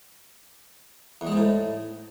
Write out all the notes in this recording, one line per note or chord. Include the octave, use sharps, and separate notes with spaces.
E2
G#3
G#2
A2